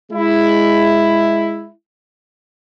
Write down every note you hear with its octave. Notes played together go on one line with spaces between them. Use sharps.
G#3 E4